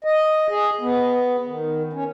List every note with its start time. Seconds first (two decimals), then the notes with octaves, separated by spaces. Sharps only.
0.04 D#5
0.49 G#4
0.81 B3
1.47 D#3
1.93 C#4